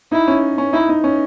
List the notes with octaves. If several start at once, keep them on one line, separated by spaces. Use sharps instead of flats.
D#4 E4
C#4
C#4
D#4 E4
D#4
C#4